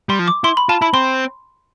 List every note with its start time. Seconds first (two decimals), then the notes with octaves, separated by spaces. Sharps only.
0.09 G3 C6
0.19 F3
0.28 D6
0.44 E4 C6
0.57 B5
0.69 F4 A5
0.82 E4 B5
0.94 C4 C6